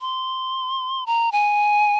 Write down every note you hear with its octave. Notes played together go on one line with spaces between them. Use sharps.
C6
A#5
G#5